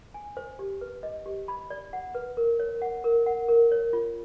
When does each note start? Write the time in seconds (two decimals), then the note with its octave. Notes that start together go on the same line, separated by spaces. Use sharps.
0.14 G#5
0.37 C5
0.59 G4
0.81 B4
1.03 D#5
1.26 G4
1.48 B5
1.70 D5
1.93 F#5
2.15 B4
2.37 A#4
2.60 C#5
2.82 F#5
3.04 A#4
3.26 F#5
3.49 A#4
3.72 C#5
3.93 F4